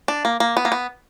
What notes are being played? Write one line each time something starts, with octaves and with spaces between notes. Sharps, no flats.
D4
A#3
A#3
B3
A#3
B3